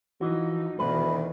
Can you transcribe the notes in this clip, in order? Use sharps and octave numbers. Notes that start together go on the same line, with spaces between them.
E3 F3 D#4 F#4
D2 B2 D#3 E3 B4